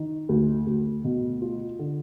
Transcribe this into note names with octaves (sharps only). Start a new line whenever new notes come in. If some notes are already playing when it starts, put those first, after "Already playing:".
Already playing: D#3
D2
D2
B2
F4
D3